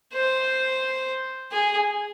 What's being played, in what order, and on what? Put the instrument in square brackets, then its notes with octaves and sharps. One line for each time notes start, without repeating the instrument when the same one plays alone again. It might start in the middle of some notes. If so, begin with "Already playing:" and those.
[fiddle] C5
G#4